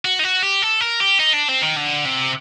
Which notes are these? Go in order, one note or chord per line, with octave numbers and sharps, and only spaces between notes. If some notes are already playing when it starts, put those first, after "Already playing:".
F#4
D#4
F#4
G4
A4
A#4
G4
D#4
D4
C4
D#3
D3
C3